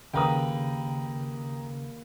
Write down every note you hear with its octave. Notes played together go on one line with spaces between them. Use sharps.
D#2 C#3 B4 G5 A#5 D#6